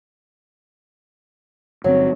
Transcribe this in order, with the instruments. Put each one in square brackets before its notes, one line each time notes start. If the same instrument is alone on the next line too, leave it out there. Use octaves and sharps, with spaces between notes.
[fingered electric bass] G1 C4 [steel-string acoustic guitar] F#3